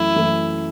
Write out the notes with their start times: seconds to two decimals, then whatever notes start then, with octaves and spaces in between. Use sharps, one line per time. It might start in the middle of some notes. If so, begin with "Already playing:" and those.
Already playing: F#2 E3 A3 E4
0.14 F#2 E3 A3